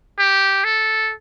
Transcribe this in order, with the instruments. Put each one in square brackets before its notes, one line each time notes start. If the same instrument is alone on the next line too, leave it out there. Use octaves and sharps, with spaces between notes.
[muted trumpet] G4
A4